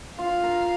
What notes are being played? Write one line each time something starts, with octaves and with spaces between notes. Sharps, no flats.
F4 F5
A#4